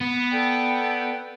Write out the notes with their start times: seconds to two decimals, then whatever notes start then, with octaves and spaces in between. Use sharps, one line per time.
0.01 B3
0.31 A4 D5 G5